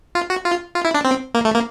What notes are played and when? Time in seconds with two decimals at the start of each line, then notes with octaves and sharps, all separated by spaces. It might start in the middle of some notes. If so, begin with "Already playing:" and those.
0.15 F4
0.30 F#4
0.45 F4
0.75 F4
0.85 E4
0.95 D4
1.05 C4
1.34 A#3
1.45 A3
1.54 A#3